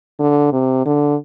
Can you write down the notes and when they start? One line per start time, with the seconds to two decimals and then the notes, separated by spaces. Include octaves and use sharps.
0.19 D3
0.53 C3
0.86 D3